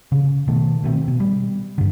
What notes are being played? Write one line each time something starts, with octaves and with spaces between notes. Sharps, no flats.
C#3
B2 D#3 A3
B2 D#3 A3 C4
B2
G3
G2 D3